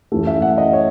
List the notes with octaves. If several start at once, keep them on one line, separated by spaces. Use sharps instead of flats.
F#2 E3 A3
E5
F#5
D#5
C#5